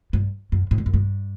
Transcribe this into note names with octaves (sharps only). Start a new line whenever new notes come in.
G2
F#2
G#2
G2
F#2
G2